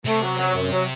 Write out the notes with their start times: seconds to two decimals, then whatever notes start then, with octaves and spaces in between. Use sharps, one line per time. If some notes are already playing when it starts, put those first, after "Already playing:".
0.05 C3 A3
0.22 F#3
0.38 F#3
0.55 F#2
0.72 F#3